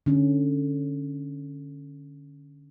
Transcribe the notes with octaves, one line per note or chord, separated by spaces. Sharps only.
D3 C#4